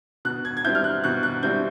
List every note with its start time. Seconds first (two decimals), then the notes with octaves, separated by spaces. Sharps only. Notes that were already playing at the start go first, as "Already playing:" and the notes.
0.25 B2 F#6
0.45 G#6
0.57 G#6
0.64 G3 C4 E4 G6
0.75 F6
0.84 F#6
1.04 B2 F#6
1.23 F#6
1.43 G3 C4 E4 G6